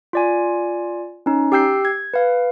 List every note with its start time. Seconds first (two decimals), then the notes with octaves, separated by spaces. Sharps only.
0.13 F4 D5 G#5
1.26 C#4 D#4
1.52 G4 G5 E6 G6 C7
1.85 G#6
2.14 B4 F5